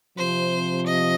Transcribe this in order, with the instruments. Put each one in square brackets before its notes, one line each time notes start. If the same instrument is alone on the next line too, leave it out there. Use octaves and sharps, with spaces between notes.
[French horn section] C3 F3 [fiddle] C5
[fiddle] D#5